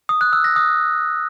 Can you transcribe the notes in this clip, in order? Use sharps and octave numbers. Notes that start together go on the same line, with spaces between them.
D#6
F#6
E6
A#6
D#6